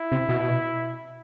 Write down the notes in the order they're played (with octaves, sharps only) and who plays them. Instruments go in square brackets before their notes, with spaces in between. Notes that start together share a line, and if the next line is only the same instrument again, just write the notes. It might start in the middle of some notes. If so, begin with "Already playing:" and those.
Already playing: [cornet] E4
[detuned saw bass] C3
B2